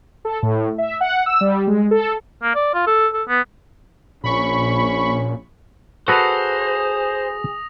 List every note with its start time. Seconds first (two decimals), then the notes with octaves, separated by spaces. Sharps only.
0.25 A4
0.43 A2
0.78 E5
1.01 F#5
1.26 E6
1.41 G3
1.67 G#3
1.91 A4
2.43 A#3
2.55 D5
2.74 F4
2.87 A4
3.14 A4
3.28 B3
4.24 A#1 A#2 C#4 B5 C#6
6.08 F#4 G#4 A4 B4 C5 D#6 A#6 F7